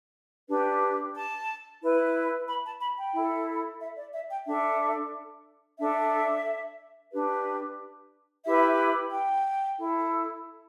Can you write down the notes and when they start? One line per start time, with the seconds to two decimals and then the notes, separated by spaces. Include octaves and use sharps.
0.49 D4 G4 B4
1.15 A5
1.81 E4 B4
2.47 B5
2.64 A5
2.81 B5
2.97 G5
3.14 E4 A4
3.80 E5
3.97 D5
4.13 E5
4.30 G5
4.46 D4 A4 E5
5.79 D4 A4 E5
7.11 D4 G4 B4
8.44 E4 G4 B4 E5
9.10 G5
9.76 E4 A4